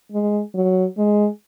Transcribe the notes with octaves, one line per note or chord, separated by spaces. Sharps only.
G#3
F#3
G#3